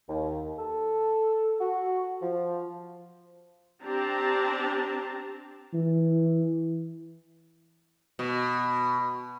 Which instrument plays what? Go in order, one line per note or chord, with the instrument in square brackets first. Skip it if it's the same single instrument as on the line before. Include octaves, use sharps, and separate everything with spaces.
[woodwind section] D#2
A4
F#4
F3
[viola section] C4 D4 G4 A5 A#5
[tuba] E3
[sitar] B2